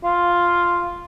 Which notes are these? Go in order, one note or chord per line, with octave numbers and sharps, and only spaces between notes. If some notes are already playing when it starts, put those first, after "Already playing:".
F4